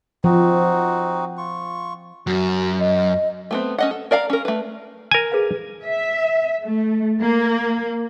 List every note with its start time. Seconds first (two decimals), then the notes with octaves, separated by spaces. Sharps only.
0.24 F3 C4 D#4 F#4
1.38 F4 C#6
2.27 F#2 F#4
2.79 D#5
3.51 A3 B3 C4
3.78 C#4 D#5 F#5
3.91 A4
4.11 A#4 D5 F5 A#5
4.30 C#4 A#4
4.45 A3 B4
5.11 A#4 G#5
5.32 G#4 B4 F5
5.83 E5
6.62 A3
7.19 A#3